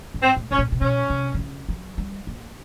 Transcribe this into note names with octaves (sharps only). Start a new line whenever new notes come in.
G#2
C4
A2
A2 C#4
A#2
C3
B2 C#4
C3
D3
C#3
F#3
G3
A#3